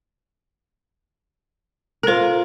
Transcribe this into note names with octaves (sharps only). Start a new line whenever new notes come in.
F4 A4 A#4 C5